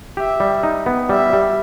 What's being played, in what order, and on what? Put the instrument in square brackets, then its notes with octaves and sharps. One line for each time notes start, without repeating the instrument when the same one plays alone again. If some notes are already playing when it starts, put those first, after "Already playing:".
[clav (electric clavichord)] G4 [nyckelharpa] E5
[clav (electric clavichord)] G3
D#4
B3
[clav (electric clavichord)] G3 [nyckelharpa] E5
[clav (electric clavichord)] G3